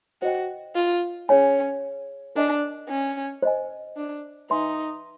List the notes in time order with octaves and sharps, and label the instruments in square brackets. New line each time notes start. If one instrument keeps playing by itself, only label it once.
[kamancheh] F#4 [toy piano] C5 D#5 G5
[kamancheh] F4
[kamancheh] C#4 [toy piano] G#4 C#5 F5 G#5
[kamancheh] D4 [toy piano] A#4 D#5 G#5
[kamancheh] C#4
[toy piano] C5 D#5 G#5
[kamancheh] D4
[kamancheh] D#4 [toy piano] B4 E5 G#5 C6